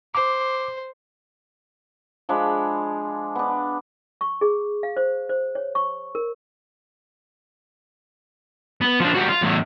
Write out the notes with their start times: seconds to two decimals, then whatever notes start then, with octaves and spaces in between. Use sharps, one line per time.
0.15 C5 D6
2.29 F3 G#3 D4 B5
3.35 B3 D4
4.21 C#6
4.41 G#4
4.83 F5
4.97 C5
5.29 C5
5.55 C#5
5.75 C#6
6.15 A#4
8.81 B3
9.00 F3 D4
9.15 G3 F#4
9.29 F4
9.43 E2 A2